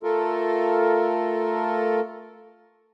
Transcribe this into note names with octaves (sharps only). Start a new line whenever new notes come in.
A3 F4 A4 A#4